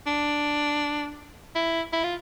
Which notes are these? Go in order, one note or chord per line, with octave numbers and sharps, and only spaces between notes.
D4
E4
E4
F4